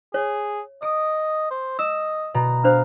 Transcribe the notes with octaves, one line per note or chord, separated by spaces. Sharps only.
G#4 C#5
D#5 D#6 D7
C5
D#5 E6 E7
B2 A#5
D4 C5 F5